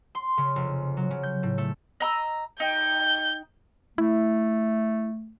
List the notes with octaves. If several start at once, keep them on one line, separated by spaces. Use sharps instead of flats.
C6
C#3
F1
F#3
C#3
G6
A2
A3
D#5 A#5 E6
D#4 G5 G6
A3 E4